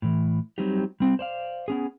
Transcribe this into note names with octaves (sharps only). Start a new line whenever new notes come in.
A2 E3
F#3 G3 C4 D#4 G4
G3 C4
C5 D5 F5
B3 C#4 G#4